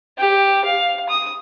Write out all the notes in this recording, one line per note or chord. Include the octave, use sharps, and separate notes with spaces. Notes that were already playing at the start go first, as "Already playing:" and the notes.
G4
F5
D#6